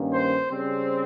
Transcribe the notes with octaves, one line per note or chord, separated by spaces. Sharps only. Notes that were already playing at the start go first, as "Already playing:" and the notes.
Already playing: G2 D#3 A#3 C#4
C5
C#3 G3 C4